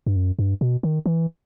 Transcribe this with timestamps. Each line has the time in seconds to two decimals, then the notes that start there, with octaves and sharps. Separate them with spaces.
0.06 G2
0.16 F#2
0.39 G2
0.61 B2
0.83 D#3
1.06 E3